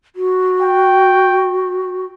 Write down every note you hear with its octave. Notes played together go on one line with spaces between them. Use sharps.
F#4
G5